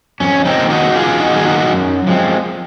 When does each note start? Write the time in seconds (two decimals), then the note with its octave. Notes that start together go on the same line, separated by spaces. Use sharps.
0.20 F2 C#4
0.45 C4 D#4
0.58 D#3 A#3
0.70 D#4 F#4
0.95 F2 F4 G#4
1.20 D#4 F#4
1.33 D#3 A#3 G#4
1.45 D#4 F#4
1.70 F#2
2.07 F3 G#3 C4